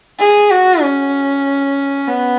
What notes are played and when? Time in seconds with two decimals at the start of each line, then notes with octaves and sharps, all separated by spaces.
0.20 G#4
0.50 F#4
0.82 C#4
2.08 B3